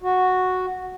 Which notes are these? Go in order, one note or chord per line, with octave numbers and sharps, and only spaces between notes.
F#4